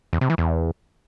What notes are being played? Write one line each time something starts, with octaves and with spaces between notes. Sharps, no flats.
E2
C3
E3
E2